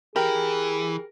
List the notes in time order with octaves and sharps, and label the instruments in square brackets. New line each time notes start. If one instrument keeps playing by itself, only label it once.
[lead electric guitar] E3 [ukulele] G4 [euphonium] G#4 [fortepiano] A#4